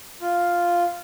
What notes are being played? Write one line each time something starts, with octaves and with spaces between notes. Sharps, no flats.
F4